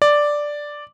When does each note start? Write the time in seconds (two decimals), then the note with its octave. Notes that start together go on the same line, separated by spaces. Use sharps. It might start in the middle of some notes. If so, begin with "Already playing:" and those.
0.02 D5